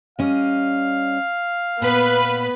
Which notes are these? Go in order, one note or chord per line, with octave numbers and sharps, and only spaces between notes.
G3 C#4 D#5 F5
A#2 B3 B4